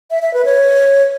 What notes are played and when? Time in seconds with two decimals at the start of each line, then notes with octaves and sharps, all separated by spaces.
0.11 E5
0.22 E5
0.34 B4
0.45 C#5